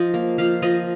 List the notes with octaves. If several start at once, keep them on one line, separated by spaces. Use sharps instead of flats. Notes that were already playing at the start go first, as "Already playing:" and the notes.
Already playing: F3 D#5
A#3
F3 F5
F3 D#5